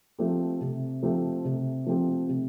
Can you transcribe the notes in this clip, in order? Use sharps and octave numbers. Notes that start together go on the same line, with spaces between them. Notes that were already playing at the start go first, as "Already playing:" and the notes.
F3 A3 C4 G4
C3
F3 A3 C4 G4
C3
F3 A3 C4 G4
C3